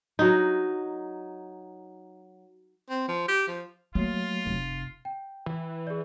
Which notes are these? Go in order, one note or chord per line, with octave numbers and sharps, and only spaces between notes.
F#3 D#4
C4
F3
G4
F3
F#3 A3 A#3 F4
F1
G5
E3
G#4 D5